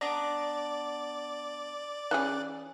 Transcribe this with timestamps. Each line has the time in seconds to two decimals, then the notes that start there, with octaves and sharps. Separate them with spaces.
0.01 B3 D4 D5 A#5
2.11 E3 C#4 G#4 F#6